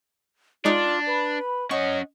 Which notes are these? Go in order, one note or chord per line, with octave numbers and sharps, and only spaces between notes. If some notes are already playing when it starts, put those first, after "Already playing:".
G#3 D4 D#4 F4 D5
B4 B5
C#4 C#5 D#5 F#5 C#6